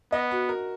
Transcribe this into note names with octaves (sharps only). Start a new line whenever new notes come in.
B3 D#5
F#4
A#4